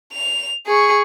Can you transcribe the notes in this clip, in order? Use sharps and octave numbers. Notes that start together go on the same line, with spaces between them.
F7
G#4 C#6